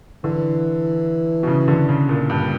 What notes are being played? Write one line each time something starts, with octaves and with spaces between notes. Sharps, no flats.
D3 E3
B2
C#3
D3
C#3
A#2
G2